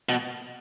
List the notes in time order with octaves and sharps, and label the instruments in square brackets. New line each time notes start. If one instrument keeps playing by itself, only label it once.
[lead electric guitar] B2